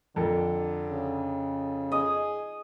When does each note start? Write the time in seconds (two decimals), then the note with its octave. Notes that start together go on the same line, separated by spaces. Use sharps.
0.16 F2 D3 A4 A#4
0.86 C#3
1.92 G#4 D#5